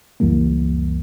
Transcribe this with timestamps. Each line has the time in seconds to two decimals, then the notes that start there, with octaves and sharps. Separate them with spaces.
0.20 C#2 F#2 E3 G3 A#3